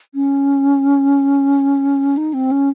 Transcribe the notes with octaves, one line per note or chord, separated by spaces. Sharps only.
C#4
D#4
C4
C#4